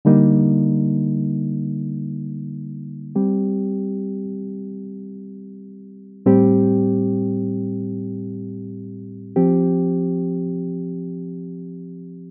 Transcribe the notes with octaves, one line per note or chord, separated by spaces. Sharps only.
D3 G3 A#3 D#4
G3 C4 G4
A2 G3 C4 G4
F3 C4 G4